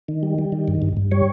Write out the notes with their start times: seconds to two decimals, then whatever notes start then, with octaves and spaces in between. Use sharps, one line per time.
0.08 D#3
0.23 G3
0.38 G3
0.52 D#3
0.68 G2
0.82 G2
0.97 G2
1.11 G3 C#5